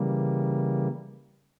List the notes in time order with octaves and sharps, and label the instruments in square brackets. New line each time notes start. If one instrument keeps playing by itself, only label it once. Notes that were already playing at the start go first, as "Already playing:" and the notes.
Already playing: [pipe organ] C#3 E3 G3 A#3